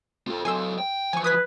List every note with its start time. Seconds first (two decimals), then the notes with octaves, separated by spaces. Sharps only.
0.28 F4 A4
0.45 F#3 A4 G#5 C6 E6
0.79 G5
1.13 E3 F3 G#5 C#6
1.24 B4 D#6 G#6 B6